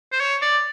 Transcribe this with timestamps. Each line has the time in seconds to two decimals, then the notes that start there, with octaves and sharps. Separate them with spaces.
0.12 C5
0.20 C#5
0.42 D5